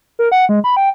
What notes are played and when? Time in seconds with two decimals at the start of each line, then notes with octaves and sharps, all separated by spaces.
0.19 A#4
0.32 F#5
0.49 G#3
0.64 B5
0.77 G5